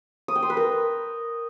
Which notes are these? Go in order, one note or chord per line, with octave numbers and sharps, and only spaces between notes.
D#6
G5
C6
B4
A#4